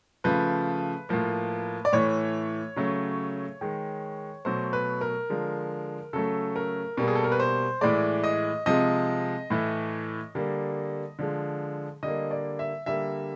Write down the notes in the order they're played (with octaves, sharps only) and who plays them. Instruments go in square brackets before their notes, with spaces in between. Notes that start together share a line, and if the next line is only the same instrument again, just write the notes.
[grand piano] C#3 F3 A3 B4
A2 F3 A#3
D5
A2 E3 A3 C#5
C#3 F#3 A3
D#3 G#3
B2 F#3 A3 C5
B4
A#4
D3 F3 G#3
C#3 F#3 A3 A4
A#4
B2 G3 A#3
G#4
A4
A#4
B4
C5
A2 E3 G#3 D5
D#5
C3 F3 G#3 D#5
A2 E3 A3
D3 G3 A#3
D3 F3 G#3
D3 G3 A#3 D#5
D5
E5
D3 G3 A#3 E5